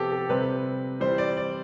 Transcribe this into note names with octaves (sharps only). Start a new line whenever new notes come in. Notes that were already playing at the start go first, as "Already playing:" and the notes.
Already playing: C3 F3 B3 G4 A4
A4
C3 G3 C4 B4
E3 G3 C4 C5
D5
D5